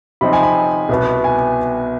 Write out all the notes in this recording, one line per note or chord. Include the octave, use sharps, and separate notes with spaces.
C3 F3 C4 D#4 B5
G#5
B5
C2 B2 B3
G#5